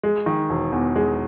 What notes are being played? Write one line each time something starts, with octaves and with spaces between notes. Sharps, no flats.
G#3
D#3
E1
E2
G#3